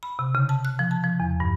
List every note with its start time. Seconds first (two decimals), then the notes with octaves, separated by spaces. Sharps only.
0.03 B5
0.19 C3
0.35 C#3
0.49 A5
0.65 F#6
0.79 F3
0.91 A5
1.04 F3
1.20 E2
1.40 G2